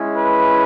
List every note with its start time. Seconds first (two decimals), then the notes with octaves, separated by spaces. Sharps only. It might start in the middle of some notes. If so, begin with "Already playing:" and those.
Already playing: G#3 C#4 E4
0.17 B4